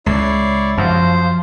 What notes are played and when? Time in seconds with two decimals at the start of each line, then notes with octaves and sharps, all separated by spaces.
0.06 C#2 E4 C#5 D5 C7
0.78 F#2 F3 C5